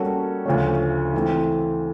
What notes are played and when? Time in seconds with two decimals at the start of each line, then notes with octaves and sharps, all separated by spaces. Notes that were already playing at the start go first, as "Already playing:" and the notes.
Already playing: G3 A#3 C#4 F#4 A4
0.46 D2 C#3 F3 A3 C#4
1.13 E3 A3 C4